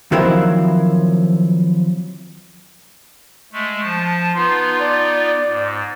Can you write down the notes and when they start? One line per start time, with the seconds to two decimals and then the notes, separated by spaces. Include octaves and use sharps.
0.12 D#3 F3 F#3 A#3 C4 E4
3.53 G#3 A3
3.83 F3 A5
4.35 B3 D#4 F4 B4 A5 C6
4.80 D5
5.48 G#2